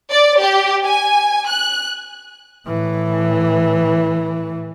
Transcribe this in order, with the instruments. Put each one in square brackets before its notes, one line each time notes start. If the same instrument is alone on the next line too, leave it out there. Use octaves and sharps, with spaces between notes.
[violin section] D5
G4
G#5
F#6
[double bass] A2 E3